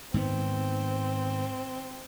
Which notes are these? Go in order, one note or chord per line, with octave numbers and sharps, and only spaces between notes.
G#2 D#3 B3 C4